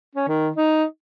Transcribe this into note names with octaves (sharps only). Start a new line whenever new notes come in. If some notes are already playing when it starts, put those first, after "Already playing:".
C#4
D#3
D#4